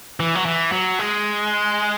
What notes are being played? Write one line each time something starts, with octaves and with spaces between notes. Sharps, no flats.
E3
F#3
E3
F#3
G#3